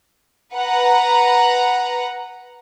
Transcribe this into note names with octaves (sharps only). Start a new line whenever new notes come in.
B4 F#5 A#5